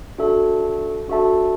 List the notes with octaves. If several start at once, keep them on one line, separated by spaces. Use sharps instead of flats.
D4 F#4 A4 E5 A5
D4 F#4 A4 E5 A5